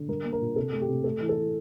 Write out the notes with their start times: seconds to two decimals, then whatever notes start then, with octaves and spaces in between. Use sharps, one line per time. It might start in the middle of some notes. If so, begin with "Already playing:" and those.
Already playing: D3
0.08 G3 A#4
0.24 A#3
0.33 A#4
0.41 A#2
0.56 C3 A4
0.73 A3
0.81 G4
0.89 C3
1.04 A3 A4
1.21 E3
1.29 A4
1.37 E3